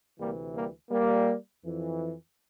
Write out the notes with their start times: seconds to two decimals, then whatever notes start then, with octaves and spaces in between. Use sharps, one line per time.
0.19 D2 C3 E3 G3 A#3
0.55 G3 A#3
0.91 G3 A#3
1.63 F2 E3